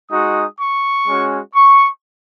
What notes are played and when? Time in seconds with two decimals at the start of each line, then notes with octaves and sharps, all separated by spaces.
0.10 G#3 D#4 F#4 D#6
0.58 C#6
1.06 G#3 C#4 F#4
1.54 C#6